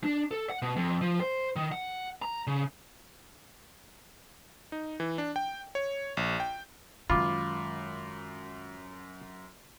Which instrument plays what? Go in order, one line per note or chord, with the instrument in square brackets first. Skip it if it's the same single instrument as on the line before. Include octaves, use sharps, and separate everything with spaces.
[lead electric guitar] D4
A4
F#5
B2
F2
F3
C5
D#3
F#5
A#5
C#3
[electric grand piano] D#4
E3
D4
G5
C#5
A#1
G5
[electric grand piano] F#2 [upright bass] D#3 G#3 [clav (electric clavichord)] F4 [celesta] B5 D6